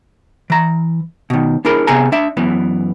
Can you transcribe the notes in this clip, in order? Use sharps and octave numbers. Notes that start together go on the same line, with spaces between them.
E3 A#5
B2 D#3
D4 E4 G#4 A#4 B5
C3 B3 G#4 G#5 A#5
D4 E5
F#2 E3 B3